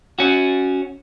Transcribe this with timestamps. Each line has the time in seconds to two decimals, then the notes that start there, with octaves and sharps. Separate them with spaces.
0.19 C#4 F#4